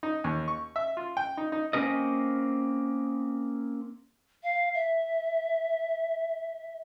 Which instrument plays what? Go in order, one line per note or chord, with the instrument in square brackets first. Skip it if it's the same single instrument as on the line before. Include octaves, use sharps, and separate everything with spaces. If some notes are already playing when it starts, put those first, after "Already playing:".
[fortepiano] D#4
D#2
C#6
E5
F4
G5
D#4
D#4
[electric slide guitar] A#3 C4 C#4 A4 A#4 D#5
[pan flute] F5
E5